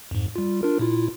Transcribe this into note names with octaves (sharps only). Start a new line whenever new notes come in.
F2 G#2
G3 F4
D4 F4 A#4
A#2 E4 F4